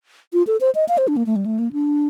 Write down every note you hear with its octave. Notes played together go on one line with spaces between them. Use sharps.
F4
A4
C5
D#5
F5
C5
D4
A#3
A3
G3
A3
A#3
D4